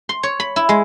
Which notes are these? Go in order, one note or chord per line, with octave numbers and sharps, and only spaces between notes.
C6
C#5
B5
E4
G#3